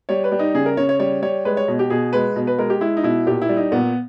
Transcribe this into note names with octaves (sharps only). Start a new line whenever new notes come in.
G3 C#5
B4
G3
D#4
C#3 G#4
A#4
C#3 C#5
C#5
G3 C#5
G3 C#5
G#3 B4
C#5
B2
G4
B2 G#4
G#3 B4
B2
B4
G#3 A#4
G4
G#3 E4
D#4
B2 E4
A#2 G4
E4
G3
D#4
A#2 B3